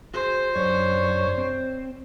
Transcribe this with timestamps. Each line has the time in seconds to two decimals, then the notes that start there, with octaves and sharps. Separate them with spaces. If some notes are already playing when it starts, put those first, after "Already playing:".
0.14 F#4 G#4 C5
0.56 F#2 C3 D4 C#5
1.38 C4